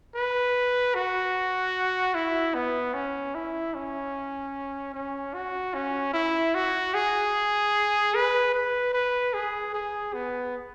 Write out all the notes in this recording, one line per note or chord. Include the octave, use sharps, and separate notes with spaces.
B4
F#4
E4
B3
C#4
E4
C#4
C#4
F#4
C#4
E4
F#4
G#4
B4
B4
B4
G#4
G#4
B3